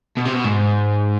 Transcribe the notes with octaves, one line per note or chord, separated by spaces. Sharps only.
B2
C3
B2
G#2